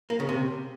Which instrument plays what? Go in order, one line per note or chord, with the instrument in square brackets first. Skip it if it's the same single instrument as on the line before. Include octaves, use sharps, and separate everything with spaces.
[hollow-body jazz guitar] A#3
C#3
C3